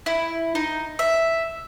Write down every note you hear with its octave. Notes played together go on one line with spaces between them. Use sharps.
E4
D#4
E5